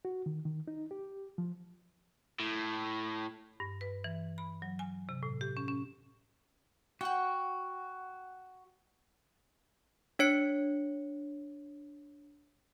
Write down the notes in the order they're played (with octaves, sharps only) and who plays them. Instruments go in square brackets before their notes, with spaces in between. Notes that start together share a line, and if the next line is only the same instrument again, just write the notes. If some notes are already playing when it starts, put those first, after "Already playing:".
[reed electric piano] F#4
D#3
D#3
D#4
G4
F3
[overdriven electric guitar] A2
[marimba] G2
B4
E3
B5
F#3
G#5
C3
A2
G4
C#4
C#4
[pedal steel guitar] F#4 [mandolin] F#5 G5
[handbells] D4 C#5 C#7